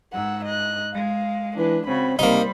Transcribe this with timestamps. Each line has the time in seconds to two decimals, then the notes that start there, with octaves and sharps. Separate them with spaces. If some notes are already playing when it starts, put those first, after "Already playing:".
0.13 G#2 F#5 E6
0.45 D#5 F#6
0.94 G#3 F5
1.57 E3 D4 B4
1.87 C#3 C4 F#4 B5
2.19 C3 G3 A#3 D#4 C5 B5